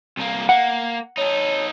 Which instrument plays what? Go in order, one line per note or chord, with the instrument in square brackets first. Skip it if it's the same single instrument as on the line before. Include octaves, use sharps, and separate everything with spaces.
[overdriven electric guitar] C2 A#3
[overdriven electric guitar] A#3 [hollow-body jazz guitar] F#5
[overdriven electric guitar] D#4 A4 [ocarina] C#5